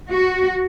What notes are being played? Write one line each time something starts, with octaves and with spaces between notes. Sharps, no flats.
F#4